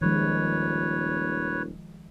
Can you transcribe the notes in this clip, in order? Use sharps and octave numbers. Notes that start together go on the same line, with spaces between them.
D#1 D#3 F3 G#3 B4 C#5